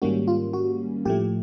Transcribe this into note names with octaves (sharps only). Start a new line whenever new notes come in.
G#2 D#3 G3 A#3 C#4 F#4
F4
F#4
A2 F3 A3 G4